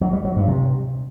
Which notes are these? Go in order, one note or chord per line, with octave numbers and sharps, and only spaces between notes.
F#3
G3
F#3
G2
C3